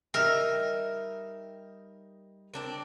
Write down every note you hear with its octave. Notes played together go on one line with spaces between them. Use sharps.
G3 D#4 A#4 E5
C4 D4 A#4